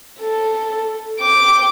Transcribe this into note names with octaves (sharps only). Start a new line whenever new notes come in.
A4
G5 D6